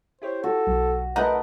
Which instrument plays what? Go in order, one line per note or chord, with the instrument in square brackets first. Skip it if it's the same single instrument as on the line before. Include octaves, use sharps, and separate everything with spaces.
[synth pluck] E4 G4 C#5 [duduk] C5
[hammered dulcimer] F#4 [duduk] A4
[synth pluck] B1 F#3
[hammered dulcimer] A3 A#4 [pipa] D#4 F#5 [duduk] B4 [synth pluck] D#5 E5 A5